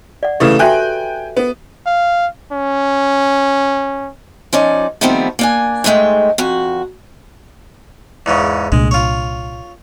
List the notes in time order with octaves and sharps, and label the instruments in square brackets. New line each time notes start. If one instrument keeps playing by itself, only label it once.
[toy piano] D5 F#5
[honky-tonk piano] C#3 E3 A3 [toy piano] G4 A4 B4
[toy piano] F#4 E5 B5 [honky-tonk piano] G5 G#5 F#6
[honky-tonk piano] B3
[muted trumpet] F5
C#4
[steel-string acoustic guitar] F3 C#4 D#4 D5
D#3 F3 G3 A3 B3 C4
A#3 D4 G#5
G#2 B2 G#3 A3 G5
F2 F#4
[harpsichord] E2 G#2 C#3
[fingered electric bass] C2 A#2 D4 [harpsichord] G#3
[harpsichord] F4 C#5